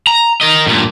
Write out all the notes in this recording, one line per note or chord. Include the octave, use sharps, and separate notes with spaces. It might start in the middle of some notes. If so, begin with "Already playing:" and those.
A#5
A#4 D#5
G2 A#2